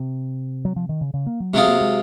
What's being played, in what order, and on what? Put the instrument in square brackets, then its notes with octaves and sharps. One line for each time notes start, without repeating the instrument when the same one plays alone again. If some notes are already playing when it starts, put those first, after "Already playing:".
Already playing: [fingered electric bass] C3
F#3
F3
D#3
C#3
C#3
A#3
F#3
[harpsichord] C3 F#3 C4 F4 G#4 [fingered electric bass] G#3
[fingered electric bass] A#3
G#3